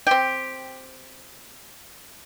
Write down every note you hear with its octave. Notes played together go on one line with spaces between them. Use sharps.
C4 G4